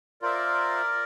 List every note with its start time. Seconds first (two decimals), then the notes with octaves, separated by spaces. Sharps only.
0.22 F4 A#4 C5 D5 E5